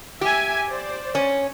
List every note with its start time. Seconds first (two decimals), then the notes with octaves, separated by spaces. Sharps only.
0.21 G4 E5 G#5
0.69 C5 D5
1.15 C#4